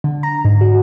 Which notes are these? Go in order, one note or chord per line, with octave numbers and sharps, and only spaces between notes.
D3
A#5
G#2
F#4